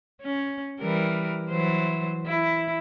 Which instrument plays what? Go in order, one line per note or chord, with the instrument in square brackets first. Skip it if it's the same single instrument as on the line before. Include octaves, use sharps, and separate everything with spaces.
[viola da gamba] C#4
E3 G3 A#4
E3 F#3 C5
E4